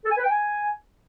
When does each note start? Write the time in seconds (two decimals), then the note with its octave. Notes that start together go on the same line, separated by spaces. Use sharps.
0.05 A4
0.11 G#5
0.17 B4
0.23 G5
0.30 G#5